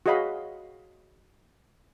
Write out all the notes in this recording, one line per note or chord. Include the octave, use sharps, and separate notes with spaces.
F#4 G#4 C#5 D#5 F5 B5